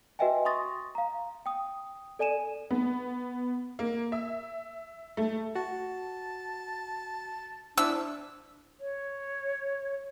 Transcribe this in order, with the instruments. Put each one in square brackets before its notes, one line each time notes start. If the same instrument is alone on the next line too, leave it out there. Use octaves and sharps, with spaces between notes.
[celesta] F#4 B4 D#5 E5 G5 G#5
C6 C#6 D#6 A6 A#6
F5 A#5
G5 D#6
A4 D5 G#5 D#7 E7
[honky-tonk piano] B3
A#3
E5
A3
[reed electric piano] F#4 [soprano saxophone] A5
[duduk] D4 [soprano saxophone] E4 [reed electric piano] C5 [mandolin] E6
[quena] C#5